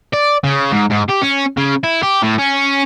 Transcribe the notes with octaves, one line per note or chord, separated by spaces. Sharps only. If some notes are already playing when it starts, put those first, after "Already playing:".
D5
C#3
G#2
G#2
G4
C#4
C#3
E4
G4
A2
C#4